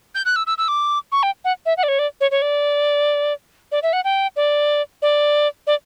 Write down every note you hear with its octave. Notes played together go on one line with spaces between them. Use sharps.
G6
F#6
E6
E6
E6
D6
C#6
G5
F#5
E5
F#5
D5
C#5
D5
C#5
C#5
D5
D5
E5
F#5
G5
D5
D5
D5